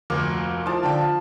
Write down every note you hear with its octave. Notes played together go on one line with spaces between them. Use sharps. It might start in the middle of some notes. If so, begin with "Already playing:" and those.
F1 D2 A#3
F3 E4 A#4 A5
D3 D4 G5
F4